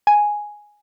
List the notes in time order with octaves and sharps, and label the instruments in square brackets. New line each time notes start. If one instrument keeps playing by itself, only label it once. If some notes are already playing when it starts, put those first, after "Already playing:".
[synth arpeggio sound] G#5